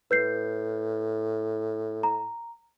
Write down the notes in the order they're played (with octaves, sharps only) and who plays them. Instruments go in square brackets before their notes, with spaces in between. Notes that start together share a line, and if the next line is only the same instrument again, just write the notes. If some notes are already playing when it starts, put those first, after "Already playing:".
[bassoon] A2 [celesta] B4 G6 C7
[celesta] A#5